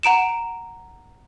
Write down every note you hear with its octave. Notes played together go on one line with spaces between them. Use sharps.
F#5 A#5 D7 E7